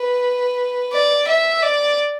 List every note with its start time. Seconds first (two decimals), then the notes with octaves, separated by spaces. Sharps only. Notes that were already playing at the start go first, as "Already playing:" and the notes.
Already playing: B4
0.93 D5
1.27 E5
1.62 D5